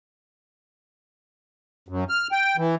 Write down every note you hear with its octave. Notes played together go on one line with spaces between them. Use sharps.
F#2
F6
G5
E3